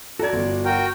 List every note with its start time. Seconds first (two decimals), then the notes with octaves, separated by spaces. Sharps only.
0.19 F#4 A4 D5 A#5 G#6
0.33 G1
0.65 F#4 A#4 G5